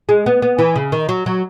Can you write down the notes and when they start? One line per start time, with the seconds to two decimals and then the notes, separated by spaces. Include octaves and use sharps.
0.09 G#3
0.26 B3
0.42 B3
0.59 E3
0.76 C#3
0.92 D#3
1.09 F#3
1.26 F#3